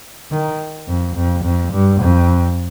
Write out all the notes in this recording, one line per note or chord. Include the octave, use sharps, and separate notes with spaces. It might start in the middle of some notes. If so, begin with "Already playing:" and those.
D#3
F2
F2
F2
G2
F2